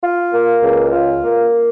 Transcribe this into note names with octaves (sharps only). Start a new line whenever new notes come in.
F4
A#3
C#2
F4
A#3